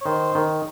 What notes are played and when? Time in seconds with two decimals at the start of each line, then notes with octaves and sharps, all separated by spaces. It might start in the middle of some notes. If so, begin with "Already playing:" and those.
0.01 C#5
0.05 D#3 C5
0.35 D#3